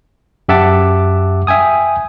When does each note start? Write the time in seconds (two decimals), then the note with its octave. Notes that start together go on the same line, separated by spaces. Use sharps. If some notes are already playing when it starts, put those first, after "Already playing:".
0.49 F#2 G4 E5 F#5 A5 D6
1.47 E5 G5 G#5 D#6